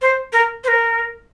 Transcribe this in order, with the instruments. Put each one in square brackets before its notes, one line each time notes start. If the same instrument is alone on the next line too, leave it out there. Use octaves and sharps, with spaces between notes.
[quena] C5
A#4
C5
A#4